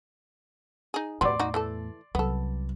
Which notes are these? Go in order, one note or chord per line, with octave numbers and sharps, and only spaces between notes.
D#4 G#4
E2 A2 F#3 G3 B3 D5 C6
D#4 F#4
E3 A3 A4
C2 F#3 B3 A4